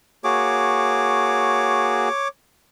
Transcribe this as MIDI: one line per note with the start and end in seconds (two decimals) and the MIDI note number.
0.24 2.09 58
0.24 2.09 66
0.24 2.09 68
0.24 2.28 73
0.24 2.28 86